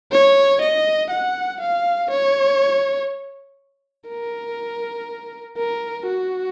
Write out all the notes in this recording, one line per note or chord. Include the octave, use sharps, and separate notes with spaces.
C#5
D#5
F#5
F5
C#5
A#4
A#4
F#4